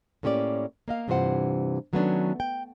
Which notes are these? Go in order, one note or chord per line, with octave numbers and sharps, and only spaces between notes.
A2 A#3 C#4 G4 C5 D5
A#3 D#5 F5
G2 C3 E3 F4 C5 F#5
D#3 F#3 A3 B3 C#4 D4
G5